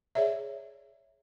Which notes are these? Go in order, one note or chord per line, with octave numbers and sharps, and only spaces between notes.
G#4 C#5 D5 E5